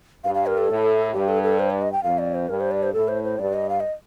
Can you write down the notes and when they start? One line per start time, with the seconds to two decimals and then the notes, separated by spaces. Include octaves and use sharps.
0.24 G2 F5
0.34 F5
0.46 A#4
0.58 A4
0.69 A2
1.13 G2 G4
1.28 A4
1.43 A4
1.59 C5
1.70 D5
1.81 D#5
1.93 G5
2.03 F2 F5
2.18 D5
2.34 C5
2.49 G2 A#4
2.60 C5
2.71 D5
2.83 C5
2.93 A2 A4
3.08 C5
3.24 C5
3.39 G2 D5
3.54 D#5
3.69 F5
3.80 D#5